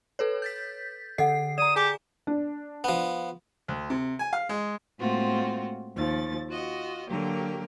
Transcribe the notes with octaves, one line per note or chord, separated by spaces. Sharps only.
A4 B4 C#5
G6 A6 B6
D3 A4 D#5 F#5 C7
D5 A#5 D#6 E7
G4 G#4 G#5 D6
D4
F3 B3
D2
C3
G#5
F5
G#3
A2 G#3 A#3 C4 F4 F#4
D#2 F3 A6
F4 F#4 D#5
D3 F#3 A#3 G4 A#4